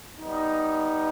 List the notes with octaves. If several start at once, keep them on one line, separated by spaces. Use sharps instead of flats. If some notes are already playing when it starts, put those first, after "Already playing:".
G3 B3 D#4